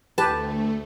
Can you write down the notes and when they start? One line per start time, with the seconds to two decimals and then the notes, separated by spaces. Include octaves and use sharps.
0.18 D2 A3 G4 B4 A5